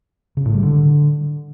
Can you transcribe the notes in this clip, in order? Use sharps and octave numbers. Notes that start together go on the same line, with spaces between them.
C#3
A2
G3
D3